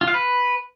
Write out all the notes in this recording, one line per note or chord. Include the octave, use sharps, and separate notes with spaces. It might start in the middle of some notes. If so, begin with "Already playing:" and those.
F4
F5
B4